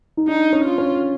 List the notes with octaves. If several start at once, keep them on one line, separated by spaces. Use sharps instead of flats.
D#4
D4 D#4
C#4
F4
C#4